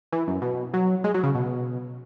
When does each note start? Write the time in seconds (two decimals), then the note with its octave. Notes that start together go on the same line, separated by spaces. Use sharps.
0.12 E3
0.28 F#2
0.42 B2
0.74 F#3
1.04 G#3
1.14 F#3
1.23 C#3
1.35 B2